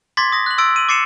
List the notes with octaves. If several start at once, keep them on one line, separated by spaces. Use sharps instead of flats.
C6 D6 G#6 A6 B6
D#6 A#6
F#6 F#7
C6 E6 A6 D7
D#7 F#7
D6 A6 C7 C#7 D#7 E7